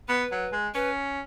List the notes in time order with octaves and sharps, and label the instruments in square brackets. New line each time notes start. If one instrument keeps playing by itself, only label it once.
[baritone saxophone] B3 [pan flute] B4
[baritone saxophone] F#3
G#3
[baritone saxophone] C#4 [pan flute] B4